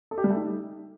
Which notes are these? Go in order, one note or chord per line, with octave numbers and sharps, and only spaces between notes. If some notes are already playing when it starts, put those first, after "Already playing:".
A4
G4
G3
A3
D#4